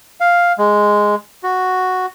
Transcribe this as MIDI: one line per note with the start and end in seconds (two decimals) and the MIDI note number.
0.21 0.52 77
0.58 1.15 56
1.43 2.06 66